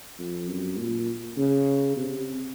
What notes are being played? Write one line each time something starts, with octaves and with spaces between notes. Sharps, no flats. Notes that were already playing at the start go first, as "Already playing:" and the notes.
F2
F#2
A#2
C#3
C3